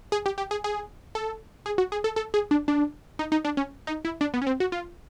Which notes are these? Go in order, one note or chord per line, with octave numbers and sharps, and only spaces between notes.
G#4
G4
G4
G#4
G#4
A4
G#4
F#4
G#4
A4
A4
G#4
D4
D4
D#4
D#4
D4
C#4
D#4
E4
D4
B3
C#4
C4
F#4
F4